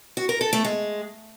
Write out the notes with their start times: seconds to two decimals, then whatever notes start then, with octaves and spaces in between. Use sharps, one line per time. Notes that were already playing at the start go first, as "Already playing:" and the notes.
0.17 F#4
0.29 A#4
0.41 A4
0.53 A3
0.64 G#3